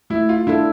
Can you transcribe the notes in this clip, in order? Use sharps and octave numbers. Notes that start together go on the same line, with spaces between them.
A3 E4
F4
D4 E4 A4